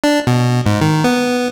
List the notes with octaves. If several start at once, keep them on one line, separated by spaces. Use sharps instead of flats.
D4
B2
G#2
D#3
B3